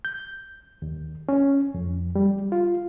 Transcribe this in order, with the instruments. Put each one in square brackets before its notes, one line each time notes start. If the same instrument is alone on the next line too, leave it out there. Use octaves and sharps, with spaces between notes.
[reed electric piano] G6
D#2
C#4
F2
G3
F4